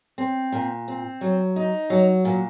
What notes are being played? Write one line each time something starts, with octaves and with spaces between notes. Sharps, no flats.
C4
A#2
C4
F#3
D#4
F#3
A#2